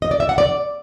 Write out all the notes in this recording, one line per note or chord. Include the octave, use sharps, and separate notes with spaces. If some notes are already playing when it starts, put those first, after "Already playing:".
D#5
D5
E5
F#5
D5